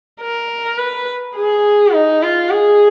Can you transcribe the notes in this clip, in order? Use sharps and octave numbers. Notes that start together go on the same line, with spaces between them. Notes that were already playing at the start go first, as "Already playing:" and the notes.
A#4
B4
G#4
D#4
F4
G#4